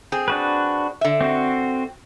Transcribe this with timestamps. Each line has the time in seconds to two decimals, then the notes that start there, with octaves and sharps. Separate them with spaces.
0.12 C4 G#4
0.28 D4 F#4 B4
1.01 D3 E5
1.21 C4 F#4